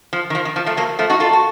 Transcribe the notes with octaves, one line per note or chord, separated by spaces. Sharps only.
F3
D#3
F3
D#3
F3
F3 A3
F#3 A#3
F3 A3
D#4 F#4
F4 A4
F#4